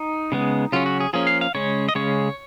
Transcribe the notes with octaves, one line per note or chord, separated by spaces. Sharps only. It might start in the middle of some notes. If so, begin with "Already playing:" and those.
Already playing: D#4
C#3 G#3 B3
C#3 F#3 C#4 F4
F#4
G#4
F3 A#3 C#4 G#4
F5
F5
C#3 G#3 C#4 C#5
D#5
C#3 G#3 C#4 C#5